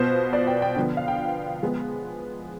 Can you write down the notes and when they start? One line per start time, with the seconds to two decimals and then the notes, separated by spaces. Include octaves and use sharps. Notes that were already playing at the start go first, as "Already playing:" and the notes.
Already playing: B2 B3 F4 C5
0.33 D5
0.47 G5
0.62 G5
0.76 D3 F3 B3
0.97 F5
1.08 G5
1.62 F3 G#3 B3